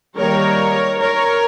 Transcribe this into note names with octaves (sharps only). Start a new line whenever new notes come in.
D#3 G3 A#3 A#4 C#5
A#4 C#5